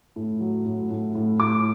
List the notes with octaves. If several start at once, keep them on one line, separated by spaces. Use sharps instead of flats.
A2
F#3
A2
A2
A2
A2 D6